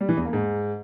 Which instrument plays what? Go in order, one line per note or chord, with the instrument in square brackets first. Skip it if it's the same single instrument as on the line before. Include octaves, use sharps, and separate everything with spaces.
[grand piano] G3
E3
E2
A#3
G#2